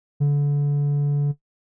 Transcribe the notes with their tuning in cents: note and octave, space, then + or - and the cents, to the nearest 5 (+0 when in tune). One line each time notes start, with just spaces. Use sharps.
D3 -30